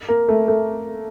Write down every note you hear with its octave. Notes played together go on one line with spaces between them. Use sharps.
A#3
A3
A3